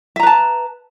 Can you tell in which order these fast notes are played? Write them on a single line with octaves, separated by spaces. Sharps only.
E5 A#5 B4 A5